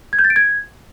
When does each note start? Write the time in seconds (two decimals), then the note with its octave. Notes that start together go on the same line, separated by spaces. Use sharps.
0.13 G#6
0.19 G6
0.24 A6
0.30 D7
0.36 G#6